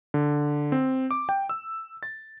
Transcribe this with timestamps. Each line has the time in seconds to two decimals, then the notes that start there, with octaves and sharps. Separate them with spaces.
0.14 D3
0.72 C4
1.11 D6
1.29 G5
1.49 E6
2.03 A6